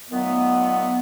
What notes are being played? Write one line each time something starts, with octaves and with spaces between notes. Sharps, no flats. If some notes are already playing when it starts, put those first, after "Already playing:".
A#2 D#3 F#3 A3 B3